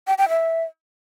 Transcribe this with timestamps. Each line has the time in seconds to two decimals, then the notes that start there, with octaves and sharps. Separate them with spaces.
0.07 G5
0.18 G5
0.29 E5